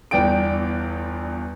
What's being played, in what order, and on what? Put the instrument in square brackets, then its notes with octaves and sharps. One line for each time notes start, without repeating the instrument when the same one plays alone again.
[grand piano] G1 E2 D5 G5 D7